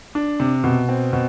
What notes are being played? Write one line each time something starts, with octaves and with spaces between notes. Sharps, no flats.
D4
C3
B2
C4
B2